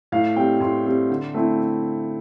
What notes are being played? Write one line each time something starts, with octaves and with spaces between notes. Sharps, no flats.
A2 F5
G3 C4 G5
A2 C6
G3 C4
D3
A3 C4 E4